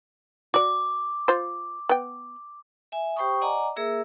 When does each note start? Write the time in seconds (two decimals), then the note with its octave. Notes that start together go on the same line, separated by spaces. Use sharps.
0.54 F#4 D5 D6
1.28 F4 C5
1.89 B3 G5
2.92 E5 G#5
3.16 G4 C5 G5 B5 C#6 D#6
3.41 D5 D#5 F#5 G#5 A#5 D6
3.76 A#3 G#4 A#4 E5 E6